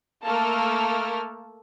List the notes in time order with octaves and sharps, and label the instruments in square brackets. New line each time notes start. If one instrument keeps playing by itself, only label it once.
[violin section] A3 A#3 A4 A#4 A5 F6